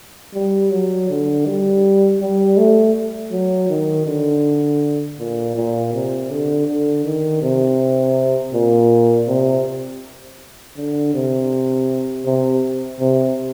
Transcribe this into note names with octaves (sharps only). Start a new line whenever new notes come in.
G3
F#3
D3
G3
G3
A3
F#3
D#3
D3
A#2
A#2
C3
D3
D3
D#3
C3
A#2
C3
D3
C3
C3
C3